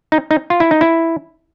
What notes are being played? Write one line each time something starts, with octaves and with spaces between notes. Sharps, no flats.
D#4
D#4
F4
E4
D#4
E4